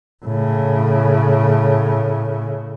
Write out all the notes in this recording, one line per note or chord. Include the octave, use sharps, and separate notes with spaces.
A2 C#3